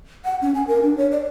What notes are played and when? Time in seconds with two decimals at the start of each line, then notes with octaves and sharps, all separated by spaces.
0.24 F#5
0.42 C#4
0.54 G#5
0.67 A#4
0.83 D4
0.98 C#5
1.11 D5